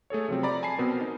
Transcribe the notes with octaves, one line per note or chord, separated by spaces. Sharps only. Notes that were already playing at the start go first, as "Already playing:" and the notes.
A3 G#4 A4 C#5
C3 F3 F#3 C4
D5 A#5 B5
G#5 A5 B5 C7
B2 B3 C4 A#4
D#4